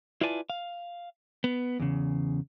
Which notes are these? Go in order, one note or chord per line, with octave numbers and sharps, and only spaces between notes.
E4 F4 B4 D5 G#5 A5
F5
B3
E2 C#3